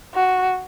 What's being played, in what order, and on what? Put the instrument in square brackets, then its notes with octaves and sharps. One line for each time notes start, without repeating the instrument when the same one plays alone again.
[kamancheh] F#4